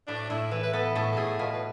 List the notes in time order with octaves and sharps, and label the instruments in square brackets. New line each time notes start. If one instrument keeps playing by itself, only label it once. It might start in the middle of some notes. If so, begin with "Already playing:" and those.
[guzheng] A2 [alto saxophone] D4
[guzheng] A2 [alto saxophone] E4
[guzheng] E3 [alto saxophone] B4
[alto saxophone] B4
[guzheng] B3 [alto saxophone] A4
[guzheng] A2 [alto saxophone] A4
[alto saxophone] A4
[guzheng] A2 [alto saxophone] G#4
[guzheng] B2 [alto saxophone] F4
[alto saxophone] B4